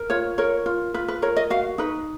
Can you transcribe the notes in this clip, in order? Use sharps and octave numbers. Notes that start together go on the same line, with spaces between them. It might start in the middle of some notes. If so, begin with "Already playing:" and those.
Already playing: A#4
F4 C#5
A#4 C#5
F4
F4 B4
B4
A#4 C#5
D#5
F#4 F5
D#4 B4